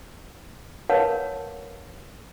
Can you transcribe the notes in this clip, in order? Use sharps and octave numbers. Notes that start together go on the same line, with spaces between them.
A#4 B4 C#5 F5 F#5 A5